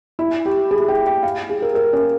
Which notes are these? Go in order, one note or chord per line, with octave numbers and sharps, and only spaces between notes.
E4
G4
G#4
G5
G5
F5
G#4
A#4
A#4
C#4